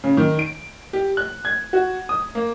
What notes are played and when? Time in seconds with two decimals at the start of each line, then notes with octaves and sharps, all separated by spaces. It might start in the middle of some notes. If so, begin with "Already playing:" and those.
0.04 C#3
0.17 D#3
0.39 D7
0.93 G4
1.17 F#6
1.45 G#6
1.73 F#4
2.09 D#6
2.35 A#3